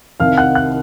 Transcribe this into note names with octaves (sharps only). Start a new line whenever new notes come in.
C2 C3 D#3 F5 F6
F#5 F#6
F#5 F#6